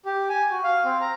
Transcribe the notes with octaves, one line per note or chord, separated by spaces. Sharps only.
G4
G#5
F#4
F5
C4
A#5